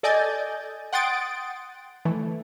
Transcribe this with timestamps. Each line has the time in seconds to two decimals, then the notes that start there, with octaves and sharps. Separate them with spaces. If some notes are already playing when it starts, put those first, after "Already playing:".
0.03 A4 D5 D#5 G#5 G6 A6
0.93 F#5 G5 C6 D#6 A6 D7
2.05 E3 A3